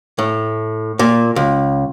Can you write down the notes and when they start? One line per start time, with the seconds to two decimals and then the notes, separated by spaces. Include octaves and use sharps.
0.19 A2
0.99 A#2
1.36 C#2